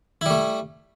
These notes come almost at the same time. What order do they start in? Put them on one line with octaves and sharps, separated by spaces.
E4 G3 A3